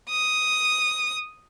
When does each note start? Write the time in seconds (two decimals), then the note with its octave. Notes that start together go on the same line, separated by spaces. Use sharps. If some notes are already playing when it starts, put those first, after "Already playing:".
0.10 D#6